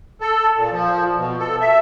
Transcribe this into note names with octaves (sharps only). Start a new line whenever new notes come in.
A4
A#2
F3
B2
A4
E5